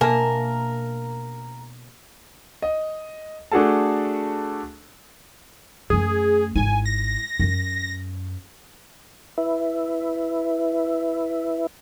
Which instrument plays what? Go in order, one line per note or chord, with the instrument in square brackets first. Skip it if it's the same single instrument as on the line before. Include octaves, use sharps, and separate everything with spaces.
[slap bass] B2 D4 [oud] A#3 [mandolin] A#4 [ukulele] E5 G#5 A5
[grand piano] D#5
A3 D4 F#4 G#4 A4 A5
[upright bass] F#2 A3 [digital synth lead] G#4
[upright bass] G#1 E4 [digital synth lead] G#5
[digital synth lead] A#6
[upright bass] F#2
[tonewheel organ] E4 B4 E5